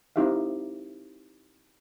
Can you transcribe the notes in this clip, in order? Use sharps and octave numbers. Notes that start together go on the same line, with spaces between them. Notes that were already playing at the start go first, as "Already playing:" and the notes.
C4 D#4 E4 G4 E5 F5